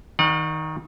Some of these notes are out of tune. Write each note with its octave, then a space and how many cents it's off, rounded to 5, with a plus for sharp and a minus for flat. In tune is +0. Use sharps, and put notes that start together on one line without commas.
D#3 +15 D5 +45 F#5 -35